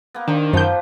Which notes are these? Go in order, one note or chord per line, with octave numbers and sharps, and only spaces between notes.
A#3 B3
D#3 D4 G4 C5
F#2 F3 B3 C5 G6